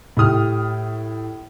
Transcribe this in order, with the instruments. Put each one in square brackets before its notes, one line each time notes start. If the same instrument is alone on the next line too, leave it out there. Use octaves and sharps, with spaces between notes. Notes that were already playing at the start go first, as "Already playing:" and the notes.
[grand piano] A2 G4 D#6 F6